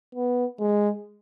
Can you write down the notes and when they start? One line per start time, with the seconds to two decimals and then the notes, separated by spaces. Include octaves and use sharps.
0.15 B3
0.59 G#3